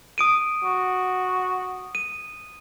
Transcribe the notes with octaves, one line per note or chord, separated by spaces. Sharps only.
D#6 D7 D#7
F#4
D#7